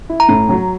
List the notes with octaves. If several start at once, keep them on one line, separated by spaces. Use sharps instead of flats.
E4
A#5
A2
F#3